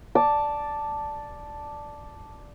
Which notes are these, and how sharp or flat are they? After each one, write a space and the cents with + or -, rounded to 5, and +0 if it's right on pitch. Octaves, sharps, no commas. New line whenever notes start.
D5 +0 A5 +0